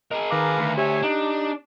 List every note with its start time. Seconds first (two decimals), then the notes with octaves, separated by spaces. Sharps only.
0.11 G#4 A#4 D#5
0.31 D#3 B4 F5 A#5 D6
0.58 D2
0.77 G4 C#5 E5 G#5
1.02 D4 D#4